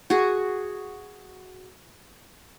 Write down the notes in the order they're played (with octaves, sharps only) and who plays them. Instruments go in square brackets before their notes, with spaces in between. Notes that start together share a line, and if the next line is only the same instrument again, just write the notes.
[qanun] F#4 G#4